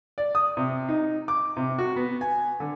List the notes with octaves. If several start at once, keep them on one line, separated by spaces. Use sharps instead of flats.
D5
D#6
C3
D#4
D6
C3
F#4
B3
G#5
D3